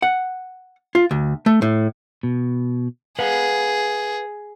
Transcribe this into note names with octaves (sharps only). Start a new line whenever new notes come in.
F#5
F4
D2
A3
A2
B2
G#4 B4 F5 F#5